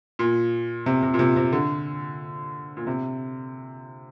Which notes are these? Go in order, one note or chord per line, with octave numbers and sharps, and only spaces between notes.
A#2
C3
C3
A#2
C3
C3
D3
A#2
C3